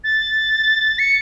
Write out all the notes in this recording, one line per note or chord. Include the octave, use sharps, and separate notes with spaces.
A6
C#7